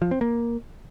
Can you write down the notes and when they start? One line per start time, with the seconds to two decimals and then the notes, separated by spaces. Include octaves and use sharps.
0.02 F3
0.11 C4
0.21 A#3